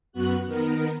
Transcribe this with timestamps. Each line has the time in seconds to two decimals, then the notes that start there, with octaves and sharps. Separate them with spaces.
0.12 F#2 B3 F#4 F#6
0.46 D#3 B3 A#4